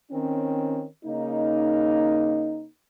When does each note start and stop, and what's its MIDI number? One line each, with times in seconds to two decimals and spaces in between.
0.11 0.85 51
0.11 0.85 60
0.11 0.85 61
1.05 2.67 49
1.05 2.67 58
1.05 2.67 63